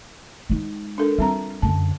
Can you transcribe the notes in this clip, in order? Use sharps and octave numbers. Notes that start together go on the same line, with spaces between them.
G#3 D#4
D4 A4 A#4
G3 C4 F4 A#5
F#2 D3 A5